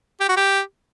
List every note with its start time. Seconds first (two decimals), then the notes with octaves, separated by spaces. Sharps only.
0.20 G4
0.29 F#4
0.37 G4